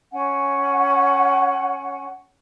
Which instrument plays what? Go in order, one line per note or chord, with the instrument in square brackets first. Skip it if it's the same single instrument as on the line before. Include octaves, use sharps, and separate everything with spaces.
[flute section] C#4 F#5 G#5